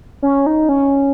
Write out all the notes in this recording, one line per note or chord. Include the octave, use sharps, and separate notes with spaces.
C#4
D#4
C#4